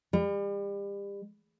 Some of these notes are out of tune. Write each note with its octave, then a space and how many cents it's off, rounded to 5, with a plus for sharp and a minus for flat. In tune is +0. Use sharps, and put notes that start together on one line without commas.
G3 +35